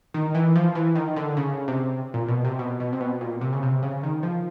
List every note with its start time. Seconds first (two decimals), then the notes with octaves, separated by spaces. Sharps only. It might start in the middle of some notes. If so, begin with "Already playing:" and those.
0.14 D#3
0.35 E3
0.56 F3
0.75 E3
0.95 D#3
1.16 D3
1.37 C#3
1.68 C3
2.14 A#2
2.28 B2
2.44 C3
2.59 B2
2.80 B2
2.93 C3
3.01 B2
3.21 A#2
3.41 C3
3.53 C#3
3.63 C3
3.82 C#3
4.03 D#3
4.23 F3